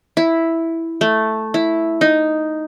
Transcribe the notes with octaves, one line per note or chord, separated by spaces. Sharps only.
E4
A3
E4
D#4